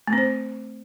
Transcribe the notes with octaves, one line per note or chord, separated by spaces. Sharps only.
A3
C4
C5